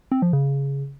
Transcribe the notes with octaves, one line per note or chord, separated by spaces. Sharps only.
C4
F3
C#3